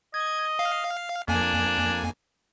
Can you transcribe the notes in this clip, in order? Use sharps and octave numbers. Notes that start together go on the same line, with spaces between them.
D#5 G#6
F5
F2 A#3 D4 G#5